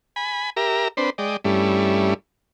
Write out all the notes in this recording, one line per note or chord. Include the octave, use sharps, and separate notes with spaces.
G#5 B5
G4 A#4 E5 A#5
C4 D4 B4 C5
G#3 D5 D#5 G5
G2 G3 A3 C#4 E4